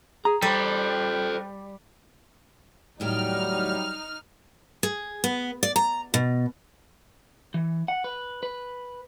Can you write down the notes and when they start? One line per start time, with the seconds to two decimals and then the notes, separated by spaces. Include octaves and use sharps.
0.25 G#4 A#5
0.42 G3 A4 C5 G5
3.00 D#2 A2 F#3 G3 D#4 G5 F6
4.83 G#4
5.24 B3
5.63 D5
5.76 A#5
6.14 B2
7.54 E3
7.88 F#5
8.04 B4
8.43 B4